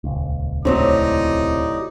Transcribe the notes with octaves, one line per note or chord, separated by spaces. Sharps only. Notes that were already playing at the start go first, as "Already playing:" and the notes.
D#1 C#2
A2 C3 F#3 C4 D#4 D5 D#6